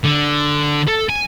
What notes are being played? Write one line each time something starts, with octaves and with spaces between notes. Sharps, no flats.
D3
A4
G#5